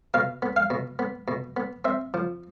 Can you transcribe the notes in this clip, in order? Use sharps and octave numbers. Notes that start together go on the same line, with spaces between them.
B2 F5
B3
F5
B2
B3
B2
B3
C4 E5
F3